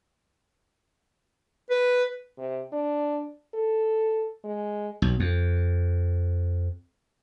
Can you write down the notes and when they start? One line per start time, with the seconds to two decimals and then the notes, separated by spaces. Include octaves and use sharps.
1.70 B4
2.38 C3
2.73 D4
3.54 A4
4.44 G#3
5.02 B1
5.20 F2